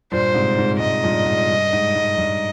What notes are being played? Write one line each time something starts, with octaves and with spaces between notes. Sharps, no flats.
G2 A#2 C5
G#2 C3
G#2
G#2 D#5
G2 A#2
G#2
G2
G#2
G#2
G2